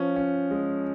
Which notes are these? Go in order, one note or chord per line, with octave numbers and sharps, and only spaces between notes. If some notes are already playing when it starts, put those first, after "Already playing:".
Already playing: F3 C#4
C#4
G#3